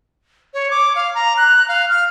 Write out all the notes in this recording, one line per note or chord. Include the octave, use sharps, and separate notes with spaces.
C#5
D6
F5
A#5
F#6
F5
F6